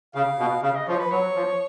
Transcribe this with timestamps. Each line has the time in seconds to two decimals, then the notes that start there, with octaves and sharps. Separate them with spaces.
0.15 C#3 F5
0.39 B2
0.62 C#3 F5
0.75 D#5
0.87 F3 C#5
0.99 B4
1.11 F#3 C#5
1.35 F3